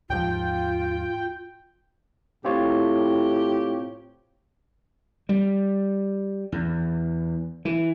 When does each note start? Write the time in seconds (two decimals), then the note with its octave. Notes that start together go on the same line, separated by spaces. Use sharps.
0.10 D#2 G#2 F3 F4 G5
2.45 A2 C4 F4 G4 C#5
5.29 G3
6.52 E2
7.65 E3